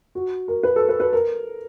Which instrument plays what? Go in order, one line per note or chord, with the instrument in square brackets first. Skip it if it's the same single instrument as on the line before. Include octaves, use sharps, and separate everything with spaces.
[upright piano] F#4
A#4
B4
A4
B4
B4
A#4